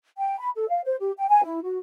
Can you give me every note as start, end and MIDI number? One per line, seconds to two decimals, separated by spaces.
0.17 0.39 79
0.39 0.49 83
0.55 0.67 69
0.69 0.81 77
0.84 0.96 72
1.00 1.12 67
1.17 1.26 79
1.28 1.42 80
1.44 1.60 64
1.63 1.78 66